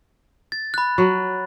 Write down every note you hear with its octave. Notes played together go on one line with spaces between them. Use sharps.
A6
B5 F#6
F#3